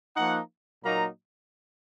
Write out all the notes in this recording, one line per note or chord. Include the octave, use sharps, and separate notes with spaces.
F3 A#3 D#4 F#5
A#2 F#3 A#3 D#4 A#5